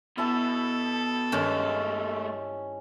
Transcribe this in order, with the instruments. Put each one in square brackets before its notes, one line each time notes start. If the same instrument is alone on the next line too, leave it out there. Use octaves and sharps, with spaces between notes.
[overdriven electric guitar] B2 [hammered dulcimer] E4 E5 A5 [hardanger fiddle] A4
[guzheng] G2 D#3 G4 [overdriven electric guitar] G#3 A3 [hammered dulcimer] C#4